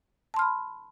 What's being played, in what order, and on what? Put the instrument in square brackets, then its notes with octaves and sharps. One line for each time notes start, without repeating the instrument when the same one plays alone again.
[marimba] A5
C6
F6
B5